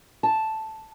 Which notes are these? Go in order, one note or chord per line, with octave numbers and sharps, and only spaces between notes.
A5